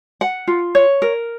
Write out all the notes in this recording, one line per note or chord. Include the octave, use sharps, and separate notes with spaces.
F#5
F4
C#5
A#4